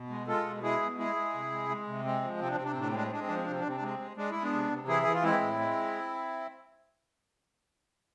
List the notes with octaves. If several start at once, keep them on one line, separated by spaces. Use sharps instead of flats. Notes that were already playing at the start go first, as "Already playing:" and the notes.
Already playing: B2
G#3
G#3 F4 A4
B2
G#3 E4 G#4
B2
G#3 E4 G#4
G#3
C3
G#3
G#3
C3
G#3 C4
F3
C3 C4
D4
C3 C4
D4
C4
A2 D4
C4
G#3 D4
C4
G#3 D4
C4
F3 D4
C4
D4
C3
C4
D4
C3 C4
D4
G#3 C4
G#3
G#3 D4
G#3 E4
B3 D4
C3
C3
E3 E4 G#4
E3 G#4
F4
G#3 C4 E4
A2
G#3